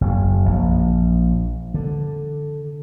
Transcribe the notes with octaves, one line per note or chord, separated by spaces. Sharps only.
F#1
A#1
D3